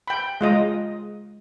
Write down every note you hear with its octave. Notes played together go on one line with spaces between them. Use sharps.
G5 B5
G#3 F4 D#5